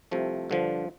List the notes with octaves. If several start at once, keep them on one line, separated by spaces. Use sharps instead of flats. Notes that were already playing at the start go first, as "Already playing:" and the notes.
C2 C3 F3 A3
G2 D3 F3